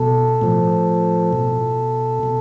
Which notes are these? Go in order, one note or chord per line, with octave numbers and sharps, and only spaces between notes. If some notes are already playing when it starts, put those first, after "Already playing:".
Already playing: B2 A4
A2 F3
B2
B2